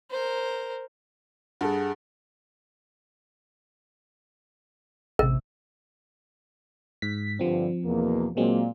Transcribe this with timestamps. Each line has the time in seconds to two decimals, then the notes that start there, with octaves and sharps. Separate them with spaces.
0.11 A#4 C5
1.61 G2 G#4 A4 F#5
5.19 A1 C3 A#4
7.02 G#2 B6
7.39 G2 D3 F3 C4
7.85 E2 B2 A#3
8.37 A#2 F#3 G#3 A#3 C4